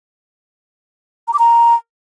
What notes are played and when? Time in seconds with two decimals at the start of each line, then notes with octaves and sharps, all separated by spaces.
1.28 A#5
1.33 D6
1.39 A#5